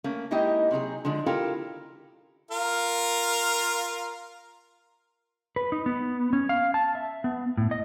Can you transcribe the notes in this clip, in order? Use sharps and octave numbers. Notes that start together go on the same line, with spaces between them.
A3 A#3 C#4
G#3 A#3 D#4 E4 G4 D#5
C3 F#3 D#4 G#4
D3 F3 G#3 D4
E4 F4 G4 A4 A#4 F5
F4 A#4 F5
B4
D#4
B3
C#4
F5
A5
E5
B3
A2
D#5